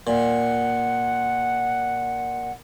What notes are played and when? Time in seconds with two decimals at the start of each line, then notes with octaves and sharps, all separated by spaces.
0.07 A#2 F#5